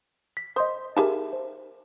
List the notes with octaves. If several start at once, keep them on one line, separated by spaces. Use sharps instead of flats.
B6
C5 D#5 C6 D#6
D#4 G4 G#4 A#4 E5 A5
C5